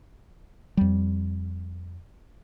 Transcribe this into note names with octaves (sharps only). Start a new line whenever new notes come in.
F2 G3